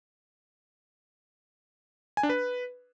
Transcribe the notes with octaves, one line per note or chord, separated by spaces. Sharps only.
G#5
D4
B4